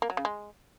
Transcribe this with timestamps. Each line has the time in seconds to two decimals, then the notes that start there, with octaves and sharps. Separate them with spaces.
0.02 A#3
0.10 F#3
0.17 C#3
0.25 G#3